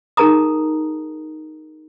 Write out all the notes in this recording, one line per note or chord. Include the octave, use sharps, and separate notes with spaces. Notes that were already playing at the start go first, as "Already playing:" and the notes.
D#4 G#4 A#4 A5 A#5 D#6